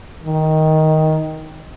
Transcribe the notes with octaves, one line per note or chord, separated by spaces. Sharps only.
D#3